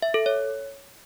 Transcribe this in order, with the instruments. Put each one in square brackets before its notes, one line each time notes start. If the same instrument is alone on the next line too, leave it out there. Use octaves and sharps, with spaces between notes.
[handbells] E5
A4
C#5